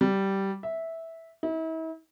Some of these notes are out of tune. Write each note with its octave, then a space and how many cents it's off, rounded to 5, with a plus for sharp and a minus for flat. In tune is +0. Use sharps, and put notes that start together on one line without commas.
G3 -10
E5 -10
E4 -40